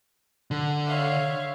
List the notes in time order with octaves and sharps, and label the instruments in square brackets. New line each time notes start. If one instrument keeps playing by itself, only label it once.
[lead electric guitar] D3
[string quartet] C#5 E5 F5